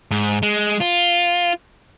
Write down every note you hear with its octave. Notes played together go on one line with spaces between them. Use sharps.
G#2
G#3
F4